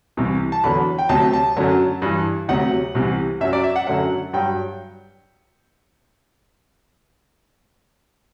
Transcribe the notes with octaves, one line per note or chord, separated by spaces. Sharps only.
C2 C3 E3
A5
E2 D3 F#3 B5
G5
D2 C3 F#3 A5
A5
F#2 D3 F#3
G2 E3
D2 C3 F#3 F#5
C2 C3 E3
F#2 F#3 E5
D5
E5
F#5
F#2 D3 F#3 F#5
G2 F#3 G5